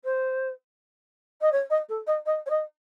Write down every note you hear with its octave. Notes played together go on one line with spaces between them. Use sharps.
C5
D#5
C#5
D#5
A4
D#5
D#5
C#5
D#5